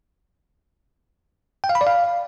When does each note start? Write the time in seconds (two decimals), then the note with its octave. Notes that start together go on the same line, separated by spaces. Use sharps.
1.64 G5
1.69 F5
1.75 B5
1.81 D5
1.87 F5